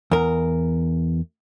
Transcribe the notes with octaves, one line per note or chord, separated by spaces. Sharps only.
E2 A#4